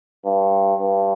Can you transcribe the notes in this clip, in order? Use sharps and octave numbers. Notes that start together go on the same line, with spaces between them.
G2
G2